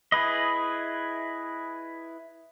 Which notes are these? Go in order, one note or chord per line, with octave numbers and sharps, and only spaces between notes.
E4 G#4 B4 D#5